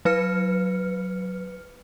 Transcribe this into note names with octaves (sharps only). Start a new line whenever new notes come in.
F#3 B4 F6 C#7